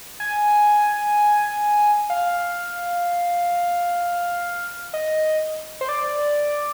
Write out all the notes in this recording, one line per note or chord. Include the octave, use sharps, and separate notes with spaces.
G#5
F5
D#5
C5
D5